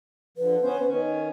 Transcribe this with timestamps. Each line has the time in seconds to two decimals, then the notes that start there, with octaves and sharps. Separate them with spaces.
0.38 D3 F3 B4
0.62 B3 C#4 C5
0.86 D#3 C#4